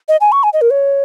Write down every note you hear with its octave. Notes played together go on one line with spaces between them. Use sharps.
D#5
G#5
C#6
G#5
D#5
A#4
C#5